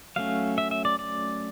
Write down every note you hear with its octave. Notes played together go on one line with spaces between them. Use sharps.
F#3 A3 C#4 F5
E5
E5
D5
D5